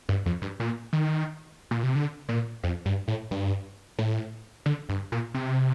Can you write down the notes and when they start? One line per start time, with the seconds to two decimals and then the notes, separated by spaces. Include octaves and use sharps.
0.09 G2
0.26 F2
0.42 G2
0.60 A#2
0.93 D#3
1.71 A#2
1.83 C3
1.95 D3
2.29 A#2
2.63 F2
2.85 G2
3.08 A2
3.31 G2
3.99 A2
4.66 D3
4.89 G2
5.12 A#2
5.34 C3